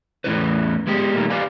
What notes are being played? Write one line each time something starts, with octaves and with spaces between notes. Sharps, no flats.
E2 A2 D#3 C#4 E4 B4
G#3 B3 G4
A#2 D#3 E3 G3 A3 A#3
G4 B4 D5 F5 G#5